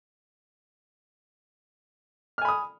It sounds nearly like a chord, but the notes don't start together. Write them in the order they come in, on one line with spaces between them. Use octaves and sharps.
F6 G#5 B5 D#6